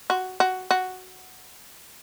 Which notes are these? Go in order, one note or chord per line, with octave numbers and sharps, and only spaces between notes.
F#4
F#4
F#4